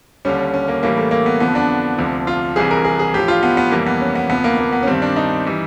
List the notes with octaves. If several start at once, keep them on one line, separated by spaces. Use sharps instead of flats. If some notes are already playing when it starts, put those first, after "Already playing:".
D#2 D3 G3 C#4
C#4
A#3
A2 E3 G3 A#3
A3
A#3
B3
F2 D3 F3 B3
D4
D2 C3 F3
F4
C2 C3 E3 G3 G#4
A#4
G#4
G#4
A2 F3 G4
F4
B3
B3
F2 C3 E3 G3 A#3
B3
C#4
B3
D2 C3 F3 B3
A#3
A#3
B3
C#4
G2 D#3 G3 C4
D4
D#4
E3 G3